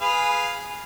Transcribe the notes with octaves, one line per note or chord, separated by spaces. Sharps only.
G#4 B4 F5